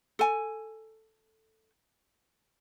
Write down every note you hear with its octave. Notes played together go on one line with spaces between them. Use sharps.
A4 G#5